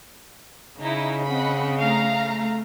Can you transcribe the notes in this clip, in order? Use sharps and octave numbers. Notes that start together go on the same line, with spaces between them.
C#3 D#4 E4
C4 D#5 F#5 B5
A3 F5 A#5